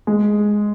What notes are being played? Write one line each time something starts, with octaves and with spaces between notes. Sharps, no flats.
G#3